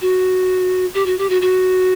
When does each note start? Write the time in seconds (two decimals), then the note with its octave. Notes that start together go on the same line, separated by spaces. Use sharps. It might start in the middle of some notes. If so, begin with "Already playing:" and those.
0.02 F#4
0.94 G4
1.06 F#4
1.18 G4
1.30 F#4
1.42 F#4